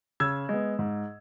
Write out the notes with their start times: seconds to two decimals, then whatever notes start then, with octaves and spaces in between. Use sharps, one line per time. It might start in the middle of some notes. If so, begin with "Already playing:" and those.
0.20 C#3 E6 G#6
0.49 G#3 B3
0.79 G#2